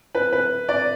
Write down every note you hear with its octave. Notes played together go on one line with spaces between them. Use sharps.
B4
B4
D5